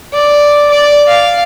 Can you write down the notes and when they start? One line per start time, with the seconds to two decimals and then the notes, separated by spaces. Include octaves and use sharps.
0.14 D5
0.71 D5
1.08 F5